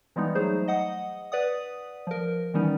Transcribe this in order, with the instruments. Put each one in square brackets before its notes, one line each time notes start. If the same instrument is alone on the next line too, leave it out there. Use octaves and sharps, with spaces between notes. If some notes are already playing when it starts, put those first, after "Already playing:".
[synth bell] E3 G3 G#3 B3 D#4
F#3 A3 D#4 G#4 C5
D#5 F#5 D#6
B4 D5 F#5 D#6
F3 A#4
D#3 E3 G3 B3 C#4 D#4